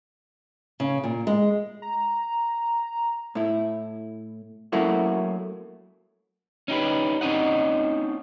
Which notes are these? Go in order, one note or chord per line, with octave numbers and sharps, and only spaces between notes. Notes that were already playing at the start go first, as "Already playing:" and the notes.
C#3
A#2
G#3
A#5
A2 E4
F#3 A3 A#3 C#4 E4 F#4
C#4 D#4 G4 B4
C4 C#4 D#4 D#5 F#5